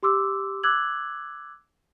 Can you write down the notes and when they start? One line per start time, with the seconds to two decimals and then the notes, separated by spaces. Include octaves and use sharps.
0.03 G4 C6 D6 E6
0.63 D6 E6 F#6 G#6 F#7